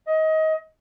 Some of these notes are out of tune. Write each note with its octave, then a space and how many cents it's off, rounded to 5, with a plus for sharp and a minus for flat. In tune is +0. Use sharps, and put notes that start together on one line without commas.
D#5 +25